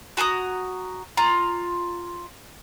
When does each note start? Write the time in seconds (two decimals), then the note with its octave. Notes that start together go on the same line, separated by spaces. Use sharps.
0.17 F#4 G#5 A#5 D#6
1.17 F4 A#5